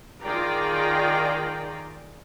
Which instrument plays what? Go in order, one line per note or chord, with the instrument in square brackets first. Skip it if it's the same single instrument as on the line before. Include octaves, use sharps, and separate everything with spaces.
[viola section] D#3 F4 G#4 D5 G5 A#5